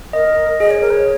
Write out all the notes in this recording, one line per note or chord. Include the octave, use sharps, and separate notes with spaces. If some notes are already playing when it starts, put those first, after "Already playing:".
A#4 D#5
G#4 D#5
C#5
A#4
C#5